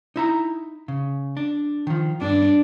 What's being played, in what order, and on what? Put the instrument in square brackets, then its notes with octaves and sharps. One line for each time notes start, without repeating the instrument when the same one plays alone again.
[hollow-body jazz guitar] D#4 E4 A#5
C#3
D4
D#3 F3
[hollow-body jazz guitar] G2 [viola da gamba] D4